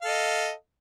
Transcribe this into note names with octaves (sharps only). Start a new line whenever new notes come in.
A4 D#5 F5